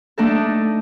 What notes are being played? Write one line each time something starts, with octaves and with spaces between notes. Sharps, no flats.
A3 D4 D#4 A4